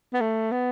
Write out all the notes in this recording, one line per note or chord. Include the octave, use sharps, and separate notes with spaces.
B3
A3
B3